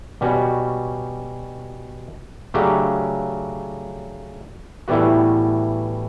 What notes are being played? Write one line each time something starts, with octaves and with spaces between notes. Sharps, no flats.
B2 G3 C#4 F#4 B4
C#3 F#3 A3 D4 G4
A2 E3 G3 B3 F#4